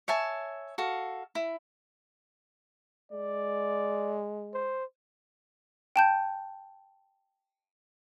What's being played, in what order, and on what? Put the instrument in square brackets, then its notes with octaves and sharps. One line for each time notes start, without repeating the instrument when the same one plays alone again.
[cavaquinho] C#5 E5 G#5 A5
F#4 A4 F5
E4
[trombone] G#3 [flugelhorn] D5
[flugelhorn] C5
[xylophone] G5 A5 G6